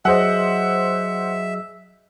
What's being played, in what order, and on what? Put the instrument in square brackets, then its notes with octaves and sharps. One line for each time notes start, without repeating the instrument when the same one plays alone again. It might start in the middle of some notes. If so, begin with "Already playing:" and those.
[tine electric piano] F#3 G#4 D#5 [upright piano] C5 F#5 [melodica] E5